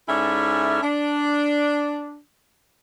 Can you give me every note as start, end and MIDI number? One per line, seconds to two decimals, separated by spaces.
0.08 0.80 44
0.08 0.80 61
0.08 0.80 64
0.08 0.80 69
0.08 0.80 74
0.08 0.80 76
0.82 2.20 62